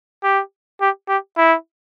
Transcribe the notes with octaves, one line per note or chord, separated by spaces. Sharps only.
G4
G4
G4
E4